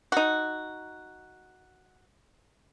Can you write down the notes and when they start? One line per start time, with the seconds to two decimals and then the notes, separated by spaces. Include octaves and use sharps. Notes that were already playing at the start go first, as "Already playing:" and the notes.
0.12 D#4 F#4